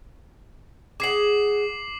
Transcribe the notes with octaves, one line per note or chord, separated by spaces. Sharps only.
G#4 F#5 D6 C7 F#7